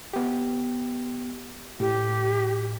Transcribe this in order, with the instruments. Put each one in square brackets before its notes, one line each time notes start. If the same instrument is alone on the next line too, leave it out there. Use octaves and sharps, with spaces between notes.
[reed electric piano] B3 G4
[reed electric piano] A2 [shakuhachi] G4